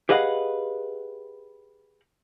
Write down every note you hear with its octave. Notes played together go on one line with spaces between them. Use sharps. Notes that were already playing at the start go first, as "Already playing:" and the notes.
G4 G#4 B4 D#5 F5 F#5